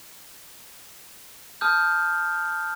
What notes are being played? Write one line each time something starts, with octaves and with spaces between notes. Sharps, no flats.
A5 D#6 F6 G6